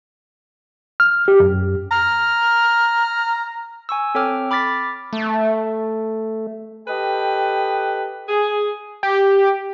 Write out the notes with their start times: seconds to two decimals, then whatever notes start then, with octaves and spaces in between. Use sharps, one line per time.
1.00 F6
1.28 G4
1.40 F#2
1.91 A#5 F6
3.89 G#5 C#6 E6
4.15 C4 A4 C#5 G5 D6 F6
4.51 B5 D6 F6 A6 B6
5.13 A3
6.88 G4 A4 B4 D#5 G5
8.28 G#4
9.03 G4